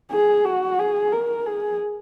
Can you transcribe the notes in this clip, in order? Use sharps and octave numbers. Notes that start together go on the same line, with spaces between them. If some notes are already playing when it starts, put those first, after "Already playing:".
G#4
F#4
G#4
A#4
G#4